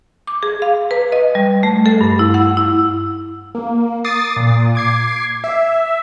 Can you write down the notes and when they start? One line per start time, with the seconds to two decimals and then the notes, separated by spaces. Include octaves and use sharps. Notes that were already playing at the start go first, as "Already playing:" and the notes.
0.27 D6
0.43 G#4
0.62 F5
0.91 B4
1.12 D#5
1.35 G3
1.63 A3
1.86 A4
2.01 G2
2.19 E4
2.34 F#5
2.57 E4
3.55 A#3
4.04 D6 D#6 A6 C7
4.37 A#2
4.75 D6 G#6 C7
5.44 E5